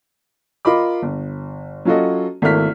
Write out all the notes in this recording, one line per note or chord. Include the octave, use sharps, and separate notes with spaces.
F4 A#4 D#5 B5 D6
G1
F#3 C#4 F4 F#4 A4 D#5
G#1 A3 A#3 E4 F6 B6